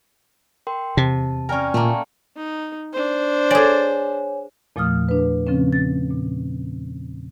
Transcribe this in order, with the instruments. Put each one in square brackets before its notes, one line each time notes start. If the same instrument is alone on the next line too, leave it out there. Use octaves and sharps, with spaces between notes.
[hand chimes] A#4 G5 C6
[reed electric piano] E2 [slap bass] C3 [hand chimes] A5
[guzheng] C#4 A#4 [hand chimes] D5 G5 G#5
[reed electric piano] A#2 [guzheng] A3 A#3
[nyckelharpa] D#4
D4 C5
[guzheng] G#4 D5 [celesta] C#5 G#5
[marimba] E2 A#2 F3 A3 D#6 F6
D4 B4
C#3 F3 C4 C#4
A6
A#2